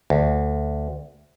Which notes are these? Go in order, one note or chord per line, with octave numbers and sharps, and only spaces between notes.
D2